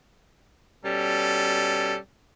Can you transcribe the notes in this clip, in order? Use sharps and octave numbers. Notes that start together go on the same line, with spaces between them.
B2 G3 C#4 A4